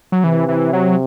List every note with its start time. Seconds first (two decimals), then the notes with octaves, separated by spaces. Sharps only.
0.12 F#3
0.24 C3 E3
0.48 E3
0.73 F#3